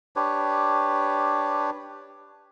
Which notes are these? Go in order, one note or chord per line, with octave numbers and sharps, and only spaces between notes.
D4 G4 B4 C#5